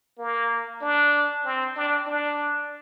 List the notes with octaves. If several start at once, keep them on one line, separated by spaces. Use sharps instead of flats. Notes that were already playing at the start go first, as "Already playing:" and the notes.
A#3
D4
C4
D4
D4